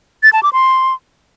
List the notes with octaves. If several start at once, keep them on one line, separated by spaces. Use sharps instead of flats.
A6
A5
D6
C6